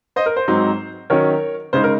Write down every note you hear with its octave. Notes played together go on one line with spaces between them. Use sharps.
C5 D#5
A#4
C5
G#2 F#3 C4 D#4
D#3 F#3 C#4 A#4 C#5
C#3 G#3 D#4 C5
A#4